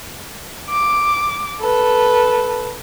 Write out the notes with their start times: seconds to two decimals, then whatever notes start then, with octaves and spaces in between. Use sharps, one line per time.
0.70 D6
1.61 A4 B4